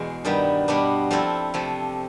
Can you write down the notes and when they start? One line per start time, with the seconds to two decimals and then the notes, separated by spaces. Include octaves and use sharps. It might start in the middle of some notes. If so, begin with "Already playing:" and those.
Already playing: E2 B2 G#3
0.25 G2 D#3 G3 B3
0.68 B2 G3 B3 D4
1.11 F3 A3 C4 E4
1.54 C3 F3 A3